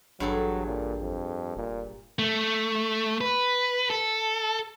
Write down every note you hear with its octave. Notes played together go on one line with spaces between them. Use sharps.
A1 G2 F#3 G#4 A4
A#2
F2
F1 A#2
A3
B4
A4